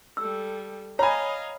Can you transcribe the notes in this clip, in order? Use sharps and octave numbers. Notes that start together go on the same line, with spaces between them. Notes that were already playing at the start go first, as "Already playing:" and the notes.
G3 A4 E6
C#5 D#5 F5 G#5 A#5 B5